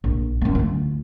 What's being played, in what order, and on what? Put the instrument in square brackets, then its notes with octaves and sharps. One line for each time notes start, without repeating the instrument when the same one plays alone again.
[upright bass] A#1
F#2 A#3
D2 F4